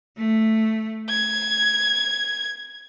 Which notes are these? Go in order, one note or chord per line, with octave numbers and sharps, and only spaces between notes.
A3
G#6